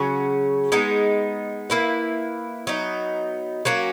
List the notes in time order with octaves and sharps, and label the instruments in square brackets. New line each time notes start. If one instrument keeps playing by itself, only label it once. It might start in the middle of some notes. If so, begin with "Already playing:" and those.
Already playing: [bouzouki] C#3 F#3 C#4 F#4
G#3 B3 D#4
A#3 E4 B4
F#3 B3 D#4
F#3 A#3 C#4 F#4